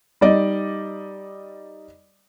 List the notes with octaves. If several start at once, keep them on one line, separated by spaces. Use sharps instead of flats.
G3 D#4 D5 D#5